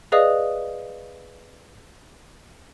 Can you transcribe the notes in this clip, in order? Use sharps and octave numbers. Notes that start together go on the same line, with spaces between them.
G#4 B4 D5 D#5 F5 D#6